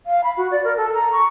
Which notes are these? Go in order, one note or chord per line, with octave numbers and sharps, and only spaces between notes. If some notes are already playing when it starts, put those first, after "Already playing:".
F5
B5
F#4
D5
A#4
A4
A#5
C#6